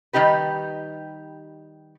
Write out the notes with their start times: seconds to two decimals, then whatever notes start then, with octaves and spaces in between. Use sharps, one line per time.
0.13 D#3 G3 D#4 G4 B4